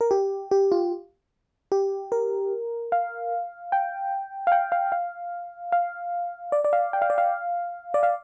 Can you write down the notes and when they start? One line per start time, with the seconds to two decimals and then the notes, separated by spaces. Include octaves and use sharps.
0.01 A#4
0.11 G4
0.51 G4
0.72 F4
1.72 G4
2.12 A#4
2.92 F5
3.72 G5
4.47 F5
4.52 G5
4.72 F5
4.92 F5
5.72 F5
6.52 D5
6.65 D5
6.73 F5
6.93 G5
7.02 F5
7.10 D5
7.18 F5
7.94 D5
8.03 F5